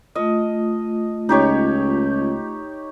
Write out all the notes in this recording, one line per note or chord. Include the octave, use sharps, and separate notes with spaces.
A3 F4 D#5
C#2 D#4 G4 C#5